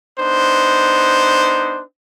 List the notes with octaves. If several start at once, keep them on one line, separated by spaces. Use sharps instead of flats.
B3 D4 D#4 C5